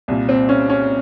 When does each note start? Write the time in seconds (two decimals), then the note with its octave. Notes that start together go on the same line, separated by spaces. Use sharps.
0.08 C2 A#2
0.29 C4
0.49 C#4
0.70 C#4